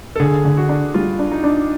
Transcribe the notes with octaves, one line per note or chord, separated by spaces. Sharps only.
A4
D3 G#4
D3
F#4
D4
G3 F4
D4
D#4
D4